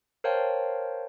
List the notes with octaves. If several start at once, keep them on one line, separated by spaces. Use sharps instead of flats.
A#4 C5 C#5 F5 G5 A5